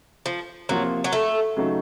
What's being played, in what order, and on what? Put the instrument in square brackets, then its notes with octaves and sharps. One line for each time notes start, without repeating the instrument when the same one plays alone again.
[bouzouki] F3
[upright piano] C3 F3 A#3 F4 [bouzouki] F#3
[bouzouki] F#3
A3
[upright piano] C#3 F#3 A3 D#4